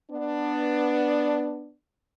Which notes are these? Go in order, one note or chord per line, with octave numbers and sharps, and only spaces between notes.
B3 D4